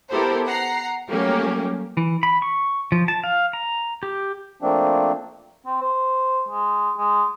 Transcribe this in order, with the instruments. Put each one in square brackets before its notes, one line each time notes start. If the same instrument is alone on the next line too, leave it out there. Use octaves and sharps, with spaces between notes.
[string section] B3 E4 G4 A4 A#4 C5
F#5 A#5 C7
F#3 G3 A3 A#3 C#4 G4
[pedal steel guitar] E3
B5
C#6
F3
A5
F5
A#5
G4
[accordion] F3 A3 A#3 C4 D4
[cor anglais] C4
C5
G#3
G#3